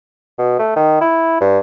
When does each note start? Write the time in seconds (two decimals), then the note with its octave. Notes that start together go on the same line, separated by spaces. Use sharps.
0.38 B2
0.59 A3
0.76 D#3
1.01 E4
1.40 G2